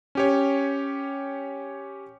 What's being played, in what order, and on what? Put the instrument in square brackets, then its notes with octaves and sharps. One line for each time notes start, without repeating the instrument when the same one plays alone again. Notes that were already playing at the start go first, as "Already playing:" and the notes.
[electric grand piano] C#4 G4 C#5